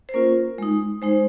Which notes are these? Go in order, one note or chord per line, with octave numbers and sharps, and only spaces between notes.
C5
A#3 C#4 F4 A#4
G#3 D#4
G#3 D#4 C5